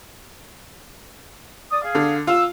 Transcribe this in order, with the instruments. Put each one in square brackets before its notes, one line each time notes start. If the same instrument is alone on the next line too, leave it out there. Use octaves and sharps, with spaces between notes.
[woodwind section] D5 D#6
G#4 F5
[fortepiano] D3
[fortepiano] F4 [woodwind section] E6